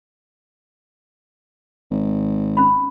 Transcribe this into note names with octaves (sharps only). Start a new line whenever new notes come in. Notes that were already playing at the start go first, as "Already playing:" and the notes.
G#1
C#4 B5